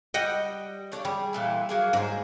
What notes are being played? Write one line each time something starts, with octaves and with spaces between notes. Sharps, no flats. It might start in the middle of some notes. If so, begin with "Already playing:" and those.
G3 D#5 F#5 G5
D4 A4 C#5
G3 G#4
A#2 E3 A4
F#3 A#3 G#4
G#2 G#4 C5